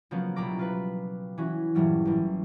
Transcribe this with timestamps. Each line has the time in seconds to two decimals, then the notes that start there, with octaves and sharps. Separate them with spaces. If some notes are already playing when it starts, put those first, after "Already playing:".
0.11 C#3 F3 F#3 A#3 B3
0.36 C2 B2 A#5 B5 D6 A#6
0.59 F4 B4
1.38 E3 C#4 F#4
1.75 G2 A#2 E3 F#3 G3
2.05 A1 E3